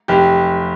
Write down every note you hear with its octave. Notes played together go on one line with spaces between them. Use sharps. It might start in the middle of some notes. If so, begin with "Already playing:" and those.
F1 G4